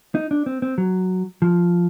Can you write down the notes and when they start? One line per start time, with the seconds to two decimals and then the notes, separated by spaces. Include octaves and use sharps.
0.15 D#4
0.31 D4
0.46 C4
0.62 C4
0.78 F#3
1.42 F3